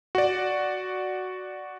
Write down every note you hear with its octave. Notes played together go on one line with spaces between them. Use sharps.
F#4 D5